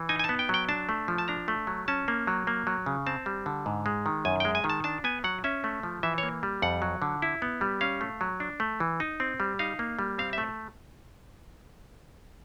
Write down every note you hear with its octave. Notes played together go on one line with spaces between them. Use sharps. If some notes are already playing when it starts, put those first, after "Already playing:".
Already playing: E3
D#4 G#5
G#5
B3 A5
G5
F#3 G5
D4 A5
A3
F3
A5
D4 A#5
A3
F#3
C#4 A5
A#3
F#3
A#3
F#3
C#3
C4 A5
G3
D3
G#2
G#3
D#3
F#2 G#5
G#3 G5
G#5
D#3
A5
D4 A5
B3 G#5
F#3 F#5
C#4 E5
A3
F3
E3 E5
A#3 C#5
G3
F2 F#5
F#3
D3
E4
B3
G3
C#4 F5
A3
F#3
D4
A3
E3
D#4
C4
G3
D#4 F5
A#3
G3
C4 F5
A3 E5